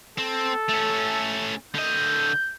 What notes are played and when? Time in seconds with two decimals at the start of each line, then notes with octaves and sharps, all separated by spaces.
0.18 C4 A4
0.69 A3 C#4
1.74 D3 D#5 G6